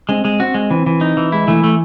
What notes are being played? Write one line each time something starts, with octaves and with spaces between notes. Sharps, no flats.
G#3 C4
G#3
C4 F#4
G#3
E3 C4
E3
D#4
E3
G#3 E4
E3 A3
A3